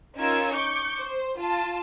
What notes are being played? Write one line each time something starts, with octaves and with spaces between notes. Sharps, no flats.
C#4 D#4 F4 A#4 E6 G#6
C#6 D6 G6 C#7
C5
F4 A5